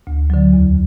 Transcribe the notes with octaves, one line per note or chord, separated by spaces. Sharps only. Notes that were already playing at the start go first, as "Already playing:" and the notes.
D2
D3 F#3
E2